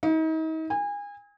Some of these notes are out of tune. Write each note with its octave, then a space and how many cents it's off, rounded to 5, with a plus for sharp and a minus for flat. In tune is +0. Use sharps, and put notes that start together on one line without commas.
D#4 +40
G#5 -30